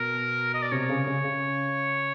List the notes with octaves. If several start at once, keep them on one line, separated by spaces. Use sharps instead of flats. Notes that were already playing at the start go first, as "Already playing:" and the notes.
Already playing: B2 A#4
D#5
D5
C3 C#5
C#3
C#3
C#3